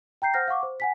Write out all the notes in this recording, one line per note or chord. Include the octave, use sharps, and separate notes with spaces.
G5 A#5 G6 C7
C5 F#5 F6 G6 A#6
F5 F#5 C#6 D6
C5
F#5 G#5 B6